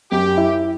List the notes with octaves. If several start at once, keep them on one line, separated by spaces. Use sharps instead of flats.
F#2 G4
E4